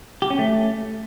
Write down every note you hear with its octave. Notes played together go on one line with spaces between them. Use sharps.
G4
C#4
A3